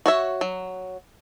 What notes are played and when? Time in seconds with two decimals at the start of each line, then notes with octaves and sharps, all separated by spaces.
0.06 F#4 C#5 E5
0.41 F#3